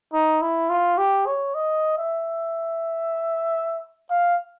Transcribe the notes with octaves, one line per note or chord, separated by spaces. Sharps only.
D#4
E4
F4
G4
C#5
D#5
E5
F5